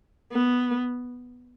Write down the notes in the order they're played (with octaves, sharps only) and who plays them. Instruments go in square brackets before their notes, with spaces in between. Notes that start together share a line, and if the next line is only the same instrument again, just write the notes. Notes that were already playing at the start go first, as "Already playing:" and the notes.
[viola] B3